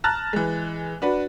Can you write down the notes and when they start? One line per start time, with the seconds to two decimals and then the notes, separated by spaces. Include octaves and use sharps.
0.04 A5 A#5 F6 F#6 A6
0.33 E3 G#3
1.02 D4 F#4 B4